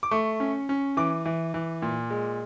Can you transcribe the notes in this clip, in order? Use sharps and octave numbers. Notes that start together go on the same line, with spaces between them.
D6
A3 C#6
C#4
C#4
E3 D6
E3
E3
A#2
G#3